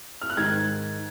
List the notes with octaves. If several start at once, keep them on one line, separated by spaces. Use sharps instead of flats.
F6
F#6
G#2 D#3 G#6